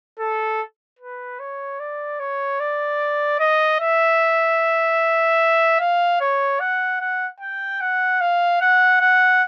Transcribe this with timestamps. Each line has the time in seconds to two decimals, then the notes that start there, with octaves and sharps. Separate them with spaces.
0.19 A4
0.99 B4
1.39 C#5
1.80 D5
2.20 C#5
2.60 D5
3.40 D#5
3.80 E5
5.80 F5
6.20 C#5
6.60 F#5
7.01 F#5
7.40 G5
7.81 F#5
8.21 F5
8.61 F#5
9.01 F#5